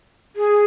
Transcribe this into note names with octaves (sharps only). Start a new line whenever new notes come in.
G#4